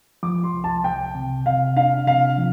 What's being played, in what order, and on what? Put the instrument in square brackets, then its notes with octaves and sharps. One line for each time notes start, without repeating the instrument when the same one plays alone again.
[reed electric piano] F3 [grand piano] D6
[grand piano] C6
[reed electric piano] C2
[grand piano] A5
[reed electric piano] C2 [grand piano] G5
[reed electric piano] C3
[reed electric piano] C3 [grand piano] F5
[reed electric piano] D4 [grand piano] F5
[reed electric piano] C3 [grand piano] F5
[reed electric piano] F3